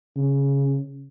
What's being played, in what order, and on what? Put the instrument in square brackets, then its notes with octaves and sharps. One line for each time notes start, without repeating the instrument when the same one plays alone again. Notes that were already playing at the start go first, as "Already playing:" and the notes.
[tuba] C#3